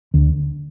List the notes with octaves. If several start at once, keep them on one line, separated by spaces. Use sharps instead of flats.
D2